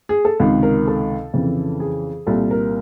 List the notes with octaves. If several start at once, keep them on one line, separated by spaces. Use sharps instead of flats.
G#4
A4
C#2 C3 D#3
A#4
A4
F2 C#3 E3
G#4
C2 A#2 A4
A#4